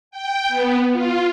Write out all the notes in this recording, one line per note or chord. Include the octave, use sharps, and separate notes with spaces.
G5
B3
F4